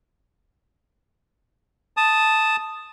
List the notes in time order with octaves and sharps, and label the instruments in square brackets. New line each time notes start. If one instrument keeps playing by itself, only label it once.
[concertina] A5 D#6